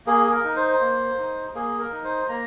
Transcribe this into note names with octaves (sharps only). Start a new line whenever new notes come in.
A#3 G#4
G#4
A#4
D#4
C5
A#3
D#4
A#3 G#4
A#4
D#4
C5
A#3 A#5